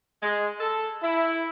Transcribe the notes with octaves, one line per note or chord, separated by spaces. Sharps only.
G#3
A4
E4